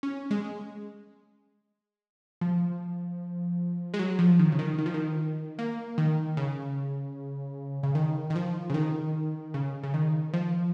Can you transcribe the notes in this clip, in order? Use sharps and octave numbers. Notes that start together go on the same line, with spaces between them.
C#4
G#3
F3
G#3
F#3
F3
D#3
C#3
D#3
D#3
F3
D#3
A#3
D#3
C#3
C#3
D#3
D#3
F3
C#3
D#3
C#3
C#3
D#3
F3